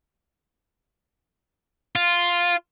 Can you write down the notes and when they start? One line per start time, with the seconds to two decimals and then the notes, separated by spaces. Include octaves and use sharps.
1.96 F4